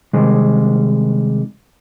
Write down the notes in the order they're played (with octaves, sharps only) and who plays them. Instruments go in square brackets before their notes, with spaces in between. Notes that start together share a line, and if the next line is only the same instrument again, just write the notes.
[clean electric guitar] C3 D#3 G3 G#3